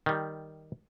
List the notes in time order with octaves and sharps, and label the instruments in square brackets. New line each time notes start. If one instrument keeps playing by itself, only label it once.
[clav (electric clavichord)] D#3 G3